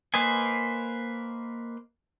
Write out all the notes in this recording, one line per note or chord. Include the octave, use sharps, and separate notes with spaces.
A#3 B4 C5 D#5 G#5